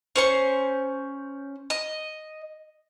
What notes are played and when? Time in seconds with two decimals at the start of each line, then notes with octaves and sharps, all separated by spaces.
0.16 C#4 C5 C#6
1.70 D#5